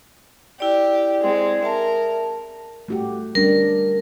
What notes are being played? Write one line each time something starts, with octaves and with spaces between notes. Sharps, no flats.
E4 G4 D5
G#3 C4
A#4 E5 A5
A3 F#4 G4
G3 C#4 D4 A#4